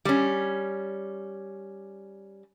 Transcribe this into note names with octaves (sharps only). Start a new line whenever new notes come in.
G3 C#4